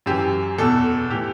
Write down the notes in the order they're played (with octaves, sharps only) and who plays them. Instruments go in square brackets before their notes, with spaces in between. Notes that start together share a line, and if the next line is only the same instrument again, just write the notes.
[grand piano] F#2 E3 G4
E2 B2 A4
A2 E3 G4